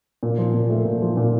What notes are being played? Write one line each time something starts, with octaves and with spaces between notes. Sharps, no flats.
A#2
F3
A#2
A3
A#2
F3
A#2